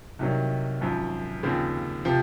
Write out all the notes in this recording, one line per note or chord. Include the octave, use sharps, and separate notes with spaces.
C2 C3 D#3 F#3
G#1 F#2 F3
D#2 C#3 F3 C4
C3 F3